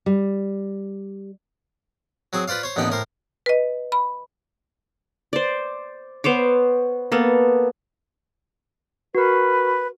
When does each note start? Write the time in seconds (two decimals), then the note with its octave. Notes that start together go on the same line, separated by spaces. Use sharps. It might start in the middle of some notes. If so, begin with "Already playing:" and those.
0.06 G3
2.33 F#3 C4 G#4
2.48 F4 B4 C5 D5 F5
2.63 C5 C#5
2.76 A1 D#2 D3 B3 D#4 G5
2.90 A2 A#4 C5
3.46 B4 D#5
3.92 B5
5.33 C5 D5
6.24 B3 C5 C#5 D6
7.12 A#3 B3 A4
9.15 F#4 A#4 B4